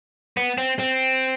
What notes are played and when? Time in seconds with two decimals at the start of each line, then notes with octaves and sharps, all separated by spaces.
0.37 B3
0.58 C4
0.79 C4